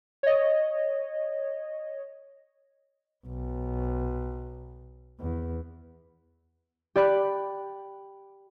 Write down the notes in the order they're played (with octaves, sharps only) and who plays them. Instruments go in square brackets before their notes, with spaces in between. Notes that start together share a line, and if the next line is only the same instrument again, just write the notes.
[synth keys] C#5 D#5
[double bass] B1
E2
[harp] G4 D5 B5 F#6